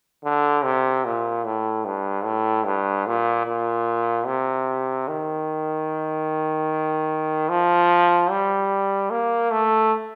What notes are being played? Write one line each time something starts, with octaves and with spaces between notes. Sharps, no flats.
D3
C3
A#2
A2
G2
A2
G2
A#2
A#2
C3
D#3
F3
G3
A#3
A3